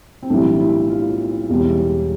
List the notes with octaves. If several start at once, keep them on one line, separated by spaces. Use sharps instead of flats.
C4
B1 A2 E3 G3 D4
E4
F4
E1 E2 B2 G3